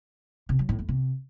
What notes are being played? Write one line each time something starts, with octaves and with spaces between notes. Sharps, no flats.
C3
F#3
A2
F2
C3